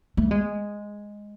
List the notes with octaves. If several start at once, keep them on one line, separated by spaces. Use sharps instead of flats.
A3
G#3